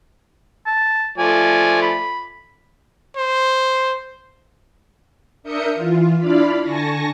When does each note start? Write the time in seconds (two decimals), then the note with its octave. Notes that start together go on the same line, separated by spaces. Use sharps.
0.66 A5
1.18 F3 A3 D5 G#5
1.82 B5
3.17 C5
5.43 D4 A#4 E5 D#6 G6 C#7
5.75 E3 F4
6.18 D4 E4 F4 D5 F5 B5
6.62 D3 G#5 A5 C#6 A#6